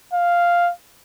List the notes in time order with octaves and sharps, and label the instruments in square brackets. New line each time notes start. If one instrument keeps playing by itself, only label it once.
[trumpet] F5